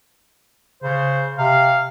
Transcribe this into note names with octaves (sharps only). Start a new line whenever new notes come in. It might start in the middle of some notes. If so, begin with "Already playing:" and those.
C#3 C5
C3 F5